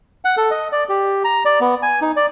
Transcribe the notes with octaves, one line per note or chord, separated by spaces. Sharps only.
F#5
A4
D#5
D5
G4
A#5
D5
B3
G#5
D#4
D5